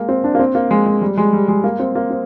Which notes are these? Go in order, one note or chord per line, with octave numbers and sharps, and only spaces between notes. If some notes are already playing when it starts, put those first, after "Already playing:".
Already playing: G#3 A#3
C4
D4
A#3
C4
A#3
G#3
G#3
G3
G#3
G3
G#3
A#3
C4
A#3
C4